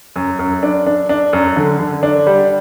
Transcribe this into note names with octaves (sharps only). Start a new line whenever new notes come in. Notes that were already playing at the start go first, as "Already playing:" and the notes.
F#2
F#2
D4
D4
D4
F#2
D3
D3
D4
G3